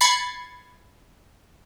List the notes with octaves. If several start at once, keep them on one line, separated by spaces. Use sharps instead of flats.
B5 G#6 A6 C7 C#7